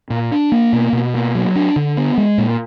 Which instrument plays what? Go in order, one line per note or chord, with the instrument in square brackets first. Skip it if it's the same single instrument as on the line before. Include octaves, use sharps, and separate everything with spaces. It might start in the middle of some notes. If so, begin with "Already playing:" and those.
[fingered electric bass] A#2
D4
A#3
B2
B2
A#3
F#3
D4
D3
B3
G#3
A#2